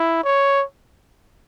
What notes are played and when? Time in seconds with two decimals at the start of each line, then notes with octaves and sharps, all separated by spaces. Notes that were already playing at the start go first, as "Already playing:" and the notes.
Already playing: E4
0.24 C#5